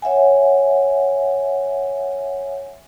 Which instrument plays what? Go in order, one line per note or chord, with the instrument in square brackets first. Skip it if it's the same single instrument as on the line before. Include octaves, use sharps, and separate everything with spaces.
[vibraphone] C#5 E5 F#5 G#5